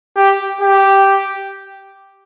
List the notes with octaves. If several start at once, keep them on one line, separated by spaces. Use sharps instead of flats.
G4
G4